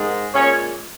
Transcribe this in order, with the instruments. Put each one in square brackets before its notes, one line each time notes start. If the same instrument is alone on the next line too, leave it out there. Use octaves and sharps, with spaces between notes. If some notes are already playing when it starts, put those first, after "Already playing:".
Already playing: [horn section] G#2 D#3 G#3
A#2 G#3 C#4 C#5